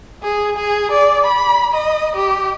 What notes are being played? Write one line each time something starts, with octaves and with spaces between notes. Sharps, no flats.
G#4
G#4
D5
B5
D#5
G4